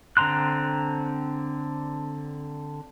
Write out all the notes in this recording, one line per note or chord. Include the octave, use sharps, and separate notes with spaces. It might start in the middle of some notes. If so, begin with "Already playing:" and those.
D3 C4 A#5 C6 F#6